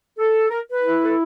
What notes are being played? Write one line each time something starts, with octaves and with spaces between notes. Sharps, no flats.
A4
A#4
B4
E4
A4